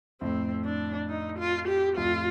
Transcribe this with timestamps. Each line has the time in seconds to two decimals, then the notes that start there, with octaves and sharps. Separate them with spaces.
0.21 F2 A2 C4
0.65 D4
1.09 D#4
1.39 F4
1.68 G4
1.97 F2 A2 F4